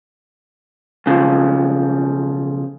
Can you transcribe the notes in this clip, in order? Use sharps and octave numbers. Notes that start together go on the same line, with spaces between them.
B1 C#3 F3